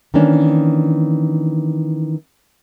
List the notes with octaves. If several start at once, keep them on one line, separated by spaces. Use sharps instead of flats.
D#3 E3 A#3 C#4 D4